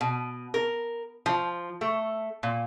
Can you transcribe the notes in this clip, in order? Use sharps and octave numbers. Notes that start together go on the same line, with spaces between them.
B2
A#4
F3
A3
A#2